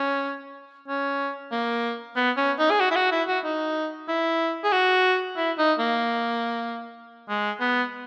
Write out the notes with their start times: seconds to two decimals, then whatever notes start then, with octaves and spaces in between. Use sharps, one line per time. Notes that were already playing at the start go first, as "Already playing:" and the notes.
Already playing: C#4
0.88 C#4
1.51 A#3
2.16 B3
2.37 C#4
2.59 D#4
2.71 G#4
2.80 F#4
2.91 E4
2.96 F#4
3.12 E4
3.28 F#4
3.44 D#4
4.08 E4
4.64 G#4
4.72 F#4
5.37 E4
5.58 D#4
5.79 A#3
7.29 G#3
7.60 B3